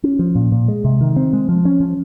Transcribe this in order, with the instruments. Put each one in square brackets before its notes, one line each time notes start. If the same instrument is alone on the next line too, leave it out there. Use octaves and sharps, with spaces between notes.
[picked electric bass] C#4
F3
A#2
A#2
G#3
C3
D#3
C4
G#3
F3
C#4
F3